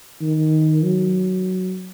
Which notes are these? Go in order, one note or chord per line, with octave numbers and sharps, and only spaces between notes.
D#3
F#3